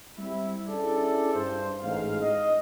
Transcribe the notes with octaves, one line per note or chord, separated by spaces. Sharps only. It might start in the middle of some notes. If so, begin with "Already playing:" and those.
G3 C4 E4
C#4 D4 E4 G#4 A4 D5
G2 C5
A1 G#2 F5
D#5